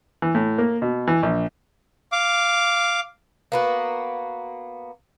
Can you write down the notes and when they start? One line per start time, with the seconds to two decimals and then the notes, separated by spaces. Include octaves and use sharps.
0.22 E3
0.35 A2
0.58 A#3
0.82 B2
1.07 E3
1.23 A#1
2.12 F5 D6
3.52 A#3 B3 F#4